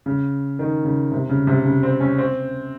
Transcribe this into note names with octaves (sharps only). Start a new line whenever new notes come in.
C#3
D#3
C#3
C3
C#3
C3
C#3
C4
C#4
C4